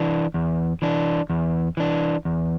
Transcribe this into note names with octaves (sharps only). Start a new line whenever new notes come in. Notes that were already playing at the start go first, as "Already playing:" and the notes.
Already playing: E3 D4
E2
E3 D4
E2
E3 D4
E2